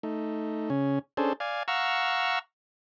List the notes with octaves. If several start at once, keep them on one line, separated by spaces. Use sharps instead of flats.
A3 D#4
C#3 C#4
C#4 D4 G#4 A4 C5
D5 F5 G#5
F5 F#5 A#5 C#6 E6